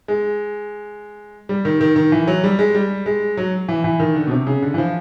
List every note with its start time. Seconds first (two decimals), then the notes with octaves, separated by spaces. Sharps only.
0.08 G#3
1.49 G3
1.65 D#3
1.81 D#3
1.96 D#3
2.12 E3
2.27 F#3
2.44 G3
2.59 G#3
2.75 G3
3.06 G#3
3.37 F#3
3.69 E3
3.84 E3
4.00 D#3
4.15 D3
4.27 B2
4.31 C3
4.47 C#3
4.62 D3
4.74 E3
4.78 F3